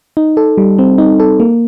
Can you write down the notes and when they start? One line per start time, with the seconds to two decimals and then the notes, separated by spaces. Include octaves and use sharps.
0.17 D#4
0.37 A4
0.58 G3
0.79 C4
0.98 D#4
1.20 A4
1.40 A#3